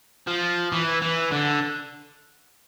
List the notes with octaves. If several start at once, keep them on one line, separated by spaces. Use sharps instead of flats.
F3
E3
E3
D3